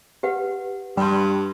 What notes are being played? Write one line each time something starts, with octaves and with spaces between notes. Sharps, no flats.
G4 B4 F#5
G2 G3 B5 C6